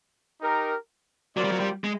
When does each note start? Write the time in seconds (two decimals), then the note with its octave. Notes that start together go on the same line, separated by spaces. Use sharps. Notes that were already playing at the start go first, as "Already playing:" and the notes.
0.42 D#4 G4 A#4
1.36 F#3 C4 F4 A#4 D5
1.44 G3
1.52 F#3
1.60 G3
1.84 G#3